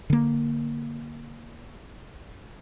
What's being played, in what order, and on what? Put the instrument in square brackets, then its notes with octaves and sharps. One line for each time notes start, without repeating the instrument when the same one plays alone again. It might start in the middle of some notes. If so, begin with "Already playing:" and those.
[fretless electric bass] D3 A#3